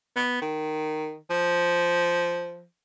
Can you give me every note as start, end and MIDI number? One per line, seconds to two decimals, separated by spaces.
0.16 0.40 59
0.42 1.16 51
1.30 2.65 53